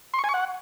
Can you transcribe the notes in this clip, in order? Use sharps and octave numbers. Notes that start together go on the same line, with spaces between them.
C6
C#6
G#5
C#6
F#5